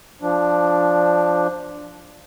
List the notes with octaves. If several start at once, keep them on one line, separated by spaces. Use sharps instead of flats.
F3 D4